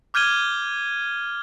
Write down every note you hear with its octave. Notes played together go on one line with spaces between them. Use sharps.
D6 F6 G6 G#6 D#7 G7